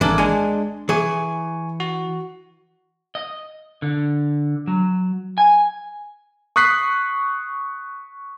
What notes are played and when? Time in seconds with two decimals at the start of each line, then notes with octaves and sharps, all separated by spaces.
0.01 G#1 E3 D4 A4 A#4
0.18 G#3 D4 G#5
0.89 E3 G#4 G#5 C#6
1.80 F#4
3.15 D#5
3.82 D3
4.67 F#3
5.38 G#5
6.56 C#6 D#6 F#6 B6 C7